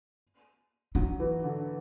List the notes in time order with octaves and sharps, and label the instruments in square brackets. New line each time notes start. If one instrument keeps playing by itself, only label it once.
[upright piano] F#3 [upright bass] D#4
[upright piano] E3
D3